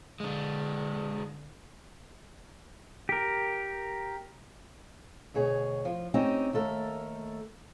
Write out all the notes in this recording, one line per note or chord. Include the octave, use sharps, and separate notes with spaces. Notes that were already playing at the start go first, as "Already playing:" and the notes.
D3 G#3 D4
G4 A#4
D2 B2 G#4 C#5
F3
C4 C#4 D#4 G4
D#2 A3 A4 A#4